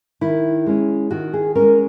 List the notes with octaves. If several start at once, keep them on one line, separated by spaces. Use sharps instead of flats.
D#3 E4
G#3 C#4
D#3 F#4
G#4
G#3 C#4 A#4